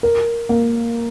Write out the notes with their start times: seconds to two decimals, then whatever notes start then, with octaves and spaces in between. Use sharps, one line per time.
0.03 A#4
0.49 A#3